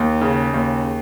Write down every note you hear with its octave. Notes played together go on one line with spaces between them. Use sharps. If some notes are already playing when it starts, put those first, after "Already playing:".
Already playing: D#2
C#3
D#2